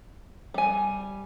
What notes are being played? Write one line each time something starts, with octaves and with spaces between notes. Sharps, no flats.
G3 G#5